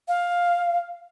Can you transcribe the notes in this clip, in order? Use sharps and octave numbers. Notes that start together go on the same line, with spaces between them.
F5